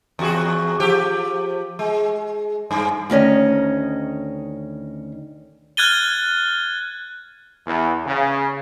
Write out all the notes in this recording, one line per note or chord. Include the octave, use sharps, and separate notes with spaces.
E2 F#4 G#4
F3 G4
G#3
G2
D2 D#3 C#4 D#5
F6 F#6 G#6 A6 D#7 G7
E2
C#3